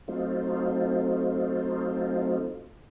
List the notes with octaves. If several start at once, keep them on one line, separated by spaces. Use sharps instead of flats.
F#3 A3 C4 D#4 F4